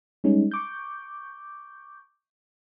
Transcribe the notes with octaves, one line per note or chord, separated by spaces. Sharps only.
G3 G#3 C#4 D#4
C#6 D6 G6